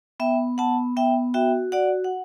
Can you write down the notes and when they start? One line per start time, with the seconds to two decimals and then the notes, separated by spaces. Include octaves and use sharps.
0.20 B3 E5 G5
0.58 B3 F#5 A5
0.96 B3 E5 G5
1.34 F#4 E5 G5
1.72 F#4 D5 F#5
2.04 F#5